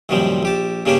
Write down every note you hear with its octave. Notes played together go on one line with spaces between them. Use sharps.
C2 F#2 A#2 D#3 F3 G3
A#1 G4 A5
G2 C#3 G3 A#3 D4 G4